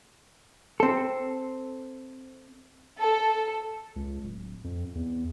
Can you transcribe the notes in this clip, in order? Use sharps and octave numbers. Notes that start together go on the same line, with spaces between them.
C4 A4
A4
C#2
D1
F2
E2